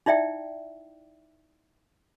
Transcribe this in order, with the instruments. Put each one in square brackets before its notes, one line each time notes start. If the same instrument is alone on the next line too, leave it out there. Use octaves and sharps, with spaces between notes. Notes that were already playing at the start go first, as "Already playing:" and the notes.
[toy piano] D#4 E4 D5 E5 G5